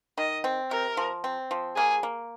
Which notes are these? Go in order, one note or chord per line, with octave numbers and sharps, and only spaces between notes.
D#3 D#5
C4
C3 A#4
F3
C4
F3
A#3 G#4
A#3